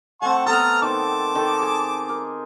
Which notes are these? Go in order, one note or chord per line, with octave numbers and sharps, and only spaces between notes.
A3 C4 F#5 A5 C#6
B3 A4 B4 A#5 F6
D#3 C4 A5 D6
D#3 A4
G#4 G#5
A#4